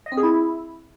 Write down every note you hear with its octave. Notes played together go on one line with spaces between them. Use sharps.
D#5
C4
G#4
E4